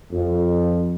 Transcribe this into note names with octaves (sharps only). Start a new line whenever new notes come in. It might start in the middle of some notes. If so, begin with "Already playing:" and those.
F2